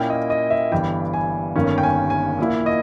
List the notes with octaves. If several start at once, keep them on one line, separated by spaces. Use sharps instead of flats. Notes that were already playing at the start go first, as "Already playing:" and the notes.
Already playing: A#2 A#3 C#4 E4 G5
D#5
D#5
E5
G1 G2 E3 G5
G#5
G1 G2 D#3 A#3 C#4
G5
G#5
G#5
A#1 A#2 A#3 E4
D#5